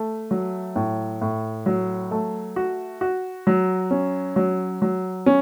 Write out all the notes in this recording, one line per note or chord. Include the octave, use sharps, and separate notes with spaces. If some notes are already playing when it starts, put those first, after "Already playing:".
Already playing: A3
F#3
A2
A2
F#3
A3
F#4
F#4
F#3
C#4
F#3
F#3
C#4